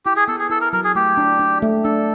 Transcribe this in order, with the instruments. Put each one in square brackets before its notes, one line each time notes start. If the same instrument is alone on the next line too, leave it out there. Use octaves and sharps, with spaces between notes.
[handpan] E4 [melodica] G4
[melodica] G#4
[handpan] B3 [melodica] A4
[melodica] G#4
[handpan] E4 [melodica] A4
[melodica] A#4
[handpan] F#3 [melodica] A#4
[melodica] G#4
[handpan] A3 [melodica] G4
[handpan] D4
D4
A3
[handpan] D4 [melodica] A4